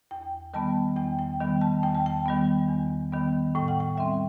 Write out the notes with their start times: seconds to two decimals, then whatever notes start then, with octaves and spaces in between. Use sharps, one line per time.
0.11 E2 G5
0.54 D#3 G3 B3 A5
0.96 E2 G5
1.19 G5
1.41 D#3 G3 B3
1.61 A5
1.83 E2 G5
1.95 A5
2.06 G5
2.26 D#3 G3 B3
2.69 E2
3.12 D#3 G3 B3
3.55 A2 G5
3.68 F#5
3.80 G5
3.97 G3 C4 E5